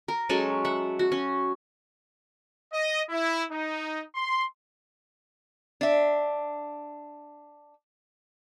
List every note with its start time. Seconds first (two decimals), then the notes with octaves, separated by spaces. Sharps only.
0.08 A#4
0.29 F#3 G#3 C#4 A4
0.65 E5 F#5
0.99 F#4
1.12 C#4
2.71 D#5
3.09 E4
3.50 D#4
4.14 C6
5.81 D4 E5